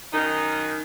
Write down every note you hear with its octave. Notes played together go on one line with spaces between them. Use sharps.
F#2 D#3 D#4